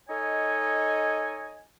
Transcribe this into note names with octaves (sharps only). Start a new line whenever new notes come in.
D#4 A4 C#5 D#5 G#5